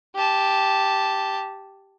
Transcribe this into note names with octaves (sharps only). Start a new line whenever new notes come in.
G4 A5